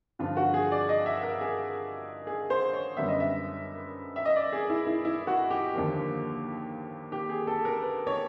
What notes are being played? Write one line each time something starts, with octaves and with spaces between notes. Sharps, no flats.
G2 D3 F3 F4
F#4
G#4
D5
D#5
E5
A#4
G#4
G#4
C5
C#5
F#2 D3 G3 B3 E5
D#5
E5
E5
D#5
D5
G#4
E4
E4
E4
F#4
G4
D#2 D3 F3 A#3
G4
G#4
A4
A#4
B4
C#5